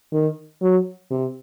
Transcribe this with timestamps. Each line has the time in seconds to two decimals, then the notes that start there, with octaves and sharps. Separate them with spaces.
0.13 D#3
0.62 F#3
1.11 C3